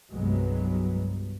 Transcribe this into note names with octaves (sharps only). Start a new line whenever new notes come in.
C2 G2 F#3 G#3 B3